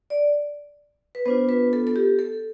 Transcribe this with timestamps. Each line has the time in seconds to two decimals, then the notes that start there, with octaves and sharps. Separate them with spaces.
0.10 D5
1.15 B4
1.26 B3 D4 F4 C5
1.49 B4
1.73 A4
1.87 A4
1.96 G4
2.19 A4